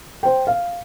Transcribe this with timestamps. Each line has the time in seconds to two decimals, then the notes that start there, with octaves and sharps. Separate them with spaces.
0.23 C5 G5
0.47 F5